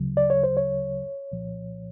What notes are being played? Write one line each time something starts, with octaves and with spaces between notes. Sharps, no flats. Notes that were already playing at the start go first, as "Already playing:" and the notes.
Already playing: D2 C#3 F#3
D5
C#5
C5
C#5
C2 A#2 F3